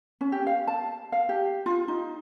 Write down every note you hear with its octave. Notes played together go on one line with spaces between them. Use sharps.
C#4
G4
F5
A5
F5
G4
F4
D#4